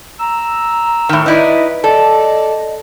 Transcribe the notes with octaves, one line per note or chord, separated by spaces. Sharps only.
A#5 E6
A2 D#3
D#4 E4 B4 D5 D#5
A4 D5 D#5